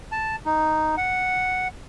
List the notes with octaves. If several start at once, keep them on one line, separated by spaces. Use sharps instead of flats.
A5
D#4
F#5